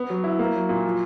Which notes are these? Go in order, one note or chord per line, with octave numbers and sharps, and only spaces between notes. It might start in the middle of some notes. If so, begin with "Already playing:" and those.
Already playing: B3
F#3
E4
A#3
F#3
A#2
F3